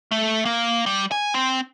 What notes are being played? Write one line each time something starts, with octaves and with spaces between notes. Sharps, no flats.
A3
A#3
G3
G#5
C4